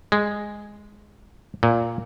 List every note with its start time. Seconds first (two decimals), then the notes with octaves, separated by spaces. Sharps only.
0.12 G#3
1.63 A#2